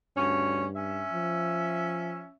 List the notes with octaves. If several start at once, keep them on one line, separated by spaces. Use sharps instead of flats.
D2 G2 C#4
C#4 E5
F3